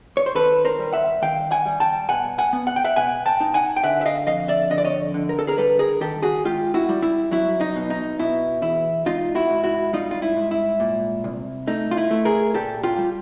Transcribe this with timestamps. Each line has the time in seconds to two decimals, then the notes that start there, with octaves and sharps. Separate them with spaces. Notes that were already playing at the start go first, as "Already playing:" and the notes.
0.17 C#5
0.26 C5
0.35 D#3 A4 B4
0.65 A#4 C5
0.79 G3
0.93 E5 F#5
1.22 D#3 F5 G5
1.51 F#5 G#5
1.66 G3
1.80 G5 A5
2.09 B2 F#5 G#5
2.38 F#5 G#5
2.53 B3
2.67 F#5
2.76 G5
2.84 E5 F#5
2.96 B2 F#5 G#5
3.26 G5 A5
3.41 D#4
3.54 F#5 G#5
3.77 G5
3.83 D3 E5 F#5
4.01 E5
4.05 D#5 F5
4.26 F2 D#5 F5
4.48 D5 E5
4.70 D3 D#5
4.78 D5
4.85 C#5 D#5
5.14 D3
5.29 A#4
5.39 A4
5.47 G#4 A#4
5.58 G3 A4 B4
5.79 G#4 A#4
6.01 D#3 G4 A4
6.23 F#4 G#4
6.45 G#2 F4 G4
6.74 E4 F#4
6.89 G3
7.02 E4
7.31 F#3 E4
7.61 D#4
7.76 B2
7.90 D#4
8.19 B2 E4
8.62 E2 E4
9.06 G#2 D#4 F4
9.35 E4 F#4
9.50 G#2
9.64 E4 F#4
9.93 G3 D#4 F4
10.11 F4
10.22 E4
10.36 G#2
10.51 E4
10.80 A#2
11.24 C2
11.67 A3 D#4
11.91 F4
11.97 E4
12.11 A3
12.25 G#4 A#4
12.54 A#2 G4 A4
12.83 F4 G4
12.98 G3